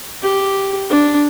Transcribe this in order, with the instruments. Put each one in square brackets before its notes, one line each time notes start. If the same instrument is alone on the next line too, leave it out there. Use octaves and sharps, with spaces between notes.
[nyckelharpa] G4
D4